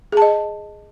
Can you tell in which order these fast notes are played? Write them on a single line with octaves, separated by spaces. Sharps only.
G#4 A5 D#5